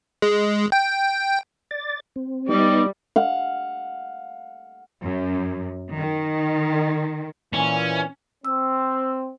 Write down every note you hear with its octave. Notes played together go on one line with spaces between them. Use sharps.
G#3
G5
D5 A6
C4
G3 B3 D#4 D#5 D6
F5 F#5
F#2
D#3
A#2 E3 C#4
C4 E6